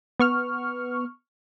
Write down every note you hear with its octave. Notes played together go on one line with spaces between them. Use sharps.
B3 C#6 F6